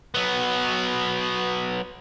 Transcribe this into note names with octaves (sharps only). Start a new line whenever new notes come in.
F#3 B3